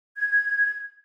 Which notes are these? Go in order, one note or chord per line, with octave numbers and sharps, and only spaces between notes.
G#6